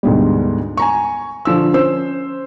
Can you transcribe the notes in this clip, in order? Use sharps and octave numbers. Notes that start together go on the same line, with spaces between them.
D2 G#2 B2 G3
G#5 A#5 C#6
D3 F3 E6
C#4 C5 E6